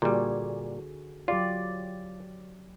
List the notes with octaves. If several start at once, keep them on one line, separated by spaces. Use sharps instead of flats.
A#2 D3 G3 F#4 G#4
F#3 F4 G4 D5